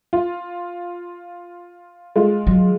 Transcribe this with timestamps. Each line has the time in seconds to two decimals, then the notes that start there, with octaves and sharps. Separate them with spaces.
0.13 F4
2.16 G#3 F4
2.47 D#3 F#3